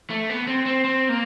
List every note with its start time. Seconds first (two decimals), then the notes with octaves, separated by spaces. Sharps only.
0.10 A3
0.30 B3
0.47 C4
0.66 C4
0.84 C4
1.09 A#3